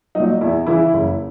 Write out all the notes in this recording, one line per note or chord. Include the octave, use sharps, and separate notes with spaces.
A#2 F#3 D#4
E2 E4
C#3 E3 E4
F#1